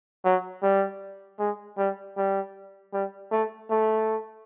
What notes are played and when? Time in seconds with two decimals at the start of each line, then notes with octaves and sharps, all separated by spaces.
0.25 F#3
0.63 G3
1.39 G#3
1.78 G3
2.17 G3
2.93 G3
3.32 A3
3.71 A3